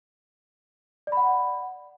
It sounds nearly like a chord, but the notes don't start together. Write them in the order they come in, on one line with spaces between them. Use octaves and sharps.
D5 B5 F#5